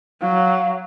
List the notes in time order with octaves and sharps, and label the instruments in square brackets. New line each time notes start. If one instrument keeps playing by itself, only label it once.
[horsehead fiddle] F#3 [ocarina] F5